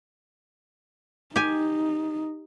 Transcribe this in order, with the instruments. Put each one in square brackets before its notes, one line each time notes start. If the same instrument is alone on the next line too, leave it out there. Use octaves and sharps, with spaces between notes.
[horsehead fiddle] D#4 [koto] G4 G#5